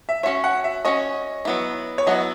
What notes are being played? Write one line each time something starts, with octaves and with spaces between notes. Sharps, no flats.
E5
C#4 F#4 C#5 E5
F#5
E5
C#4 F#4 C#5 D#5
F#3 B3 E4
C#5
F#3 B3 E4 D#5